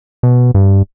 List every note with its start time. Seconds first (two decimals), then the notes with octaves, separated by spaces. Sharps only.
0.23 B2
0.55 G2